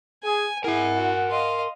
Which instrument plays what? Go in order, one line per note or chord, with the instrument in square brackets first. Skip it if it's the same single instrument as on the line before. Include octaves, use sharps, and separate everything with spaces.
[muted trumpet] G#4 [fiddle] G#5
[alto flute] E4 [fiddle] G#4 [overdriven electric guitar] A#4 G#5 [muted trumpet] F#5
[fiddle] F#4
[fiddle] D#5 F5 [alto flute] C6